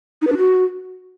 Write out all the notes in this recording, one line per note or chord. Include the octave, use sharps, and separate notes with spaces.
D#4
B4
D4
F#4